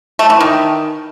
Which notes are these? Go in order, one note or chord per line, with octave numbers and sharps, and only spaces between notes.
A3
E3
D#3